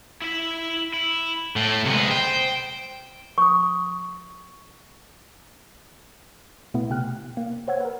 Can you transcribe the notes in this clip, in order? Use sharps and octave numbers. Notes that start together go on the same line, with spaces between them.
E4 E5
E4
A2 A3
C3 G#3 B3
C5 G5
C#6 D#6
B2 A3 B3 E4
C3 G5 F6 F#6
A#3
C5 C#5 F#5 E6 G#6
A#4 B4